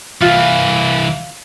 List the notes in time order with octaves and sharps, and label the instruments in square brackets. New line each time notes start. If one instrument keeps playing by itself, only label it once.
[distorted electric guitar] C2 E3 [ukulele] F4